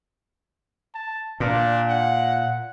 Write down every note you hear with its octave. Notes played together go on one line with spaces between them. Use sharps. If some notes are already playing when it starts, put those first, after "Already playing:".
A5
A#2 D4
F#5